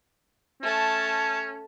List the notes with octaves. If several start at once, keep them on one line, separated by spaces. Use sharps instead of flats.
A3 C#4 A5